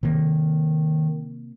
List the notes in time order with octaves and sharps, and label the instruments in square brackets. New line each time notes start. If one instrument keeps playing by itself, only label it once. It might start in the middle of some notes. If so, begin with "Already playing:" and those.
[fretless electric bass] C3 A#3 [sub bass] D#3